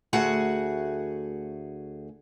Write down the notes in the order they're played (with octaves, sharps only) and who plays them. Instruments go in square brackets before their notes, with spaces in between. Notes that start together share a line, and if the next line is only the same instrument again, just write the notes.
[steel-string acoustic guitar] D2 A3 F#4 G#4 F#5